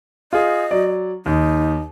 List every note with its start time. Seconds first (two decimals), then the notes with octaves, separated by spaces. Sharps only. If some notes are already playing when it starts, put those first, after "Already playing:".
0.33 F4 G#4 D#5
0.71 F#3 D5
1.26 D#2 D#4